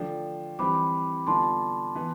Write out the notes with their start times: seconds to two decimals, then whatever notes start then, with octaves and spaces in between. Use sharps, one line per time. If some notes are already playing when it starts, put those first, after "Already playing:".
Already playing: D3 F3 A3 D4 G5
0.59 E3 G3 C4 E4 G4 B5 D6
1.27 D3 G3 B3 D4 F4 A5 C6
1.95 E3 B3 E4